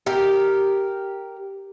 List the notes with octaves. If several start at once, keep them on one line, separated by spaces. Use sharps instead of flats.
G4 A#4